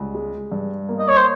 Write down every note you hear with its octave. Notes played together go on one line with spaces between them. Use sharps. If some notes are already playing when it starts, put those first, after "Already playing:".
Already playing: C#2 G3
G#3
G2
A#3
D#5
C#5
C5